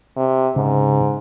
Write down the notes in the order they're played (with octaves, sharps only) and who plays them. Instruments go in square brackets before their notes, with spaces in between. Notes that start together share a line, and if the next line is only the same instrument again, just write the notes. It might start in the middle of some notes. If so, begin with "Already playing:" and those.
[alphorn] C3
[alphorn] G#2 [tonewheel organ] C#3